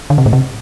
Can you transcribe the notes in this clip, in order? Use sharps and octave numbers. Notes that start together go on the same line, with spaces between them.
D3
C3
A2
C3